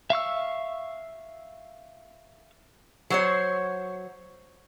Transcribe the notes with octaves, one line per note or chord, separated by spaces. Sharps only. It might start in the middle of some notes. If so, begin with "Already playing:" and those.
E5 F5 C#6 E6
F#3 C5 C#5